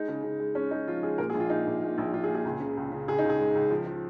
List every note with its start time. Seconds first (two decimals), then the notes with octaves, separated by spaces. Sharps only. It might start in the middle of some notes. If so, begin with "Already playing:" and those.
Already playing: G#3 D#4
0.08 C#3
0.23 C#3
0.40 G#3
0.55 G#3 C#4
0.71 G#3 D#4
0.88 F3 F4
1.03 G#3 G#4
1.18 A#2 A#4
1.30 G#4
1.34 A#1
1.40 F4
1.50 A#3 D#4
1.66 A#1
1.82 A#2
1.98 A#1
2.13 A#1 F4
2.24 G#4
2.28 A#2
2.35 G#4
2.45 C#2
2.60 C#3
2.77 C#2
2.91 C#3
3.08 C#2 G#4
3.18 D#4
3.24 C#2
3.29 G#4
3.39 G#3
3.55 C#2
3.71 F3
3.86 F3